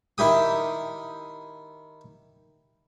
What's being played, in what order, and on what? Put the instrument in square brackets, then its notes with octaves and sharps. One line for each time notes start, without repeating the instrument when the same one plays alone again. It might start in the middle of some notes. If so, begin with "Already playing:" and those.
[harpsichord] D#3 E4 G4 D#6